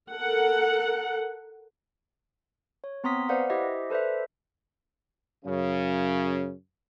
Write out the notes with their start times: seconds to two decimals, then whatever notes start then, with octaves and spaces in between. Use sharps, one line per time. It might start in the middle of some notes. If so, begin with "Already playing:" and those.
0.11 A4 A#4 F#5
2.84 C#5
3.04 B3 C4 A#5 C6 D#6 B6
3.29 B4 C5 D5 F5 F#5
3.50 E4 G4 C5 D#5 E5
3.90 A4 B4 C5 D5 E5
5.45 F#2 C#3